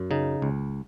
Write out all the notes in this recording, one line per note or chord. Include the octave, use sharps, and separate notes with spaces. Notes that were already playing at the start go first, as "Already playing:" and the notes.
Already playing: F#2
C#3 D#4
C#2